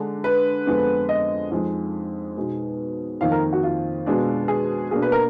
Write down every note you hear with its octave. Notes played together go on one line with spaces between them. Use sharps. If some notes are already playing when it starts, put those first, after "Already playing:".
Already playing: D3 G#3 D4
B4
F2 D3 G#3 B3
D#5
F2 F3 G#3 D#4
B2 G#3 B3 D#4
F2 D#3 A#3 D#4 F5
A#4
F#4
F4
B2 G#3 D4
G#4
B2 A#3 D4 G#4
B4
A#4